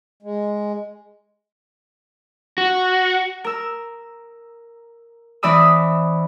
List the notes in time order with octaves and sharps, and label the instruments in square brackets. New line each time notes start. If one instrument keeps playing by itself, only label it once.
[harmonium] G#3
[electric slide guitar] F#4
[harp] A#4 E6
E3 C4 D5 B5 D#6 E6